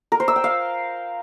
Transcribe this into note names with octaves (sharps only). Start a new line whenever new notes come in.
A#4
C5
E6
G5
F5